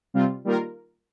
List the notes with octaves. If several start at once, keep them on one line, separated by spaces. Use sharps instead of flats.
C3 G3 C4 F4
D#3 G3 A#3 F4 A#4